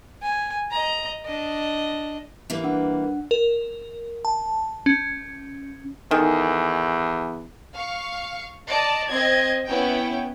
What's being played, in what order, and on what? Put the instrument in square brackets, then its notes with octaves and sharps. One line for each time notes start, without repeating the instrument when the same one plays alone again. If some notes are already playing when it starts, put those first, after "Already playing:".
[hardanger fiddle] G#5
D#5 A#5
D4 D#5
[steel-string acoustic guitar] E3 G3 A#3
[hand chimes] D4 F#5
[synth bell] A#4
A5
C#4
[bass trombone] E2 [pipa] D#3 [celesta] A4 G#5 D#6
[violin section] F5 C#6
D5 D#5 A5
C4 D#5 G#6
B3 C#4 E4 G5